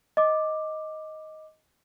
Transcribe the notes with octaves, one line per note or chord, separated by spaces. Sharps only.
D#5 D6